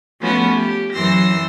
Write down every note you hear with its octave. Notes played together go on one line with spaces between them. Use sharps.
F3 A3 B3 C#4 F#4
G4
F#2 E3 C6 E6 A#6